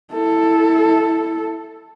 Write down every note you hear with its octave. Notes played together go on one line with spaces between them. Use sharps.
E4 A4